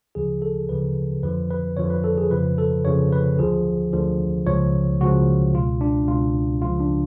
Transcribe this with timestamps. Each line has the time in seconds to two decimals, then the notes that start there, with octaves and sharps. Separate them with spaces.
0.15 D2 C#3 F3 G#4
0.42 A4
0.69 D2 C#3 F3 B4
1.23 F2 D3 F3 B4
1.51 B4
1.77 F2 D3 F3 C#5
1.90 B4
2.04 A4
2.18 G#4
2.31 F2 C#3 F3 B4
2.58 A4
2.85 F2 C#3 F3 C#5
3.13 B4
3.39 D2 D3 F3 G#4
3.93 D2 D3 F3
4.46 C#2 C#3 F3 C#5
5.00 C#2 C#3 F3 F#4
5.54 C#2 B2 F4
5.81 D4
6.08 C#2 B2 F4
6.62 C#2 C#3 F3 F4
6.80 D4